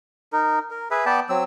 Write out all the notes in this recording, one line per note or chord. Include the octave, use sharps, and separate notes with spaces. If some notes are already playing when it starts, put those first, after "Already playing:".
D#4 A#4
A#4
G#4 B4 E5
B3 D5 G5 A5
F#3 C4 E6